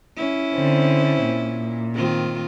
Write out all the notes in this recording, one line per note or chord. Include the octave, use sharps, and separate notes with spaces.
C#4 E4
D3 C4
A#2
D#3 C4 F4